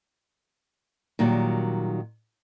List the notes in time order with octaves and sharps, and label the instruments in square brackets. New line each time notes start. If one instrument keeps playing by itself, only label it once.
[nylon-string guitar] A#2 D#3 F#3 G3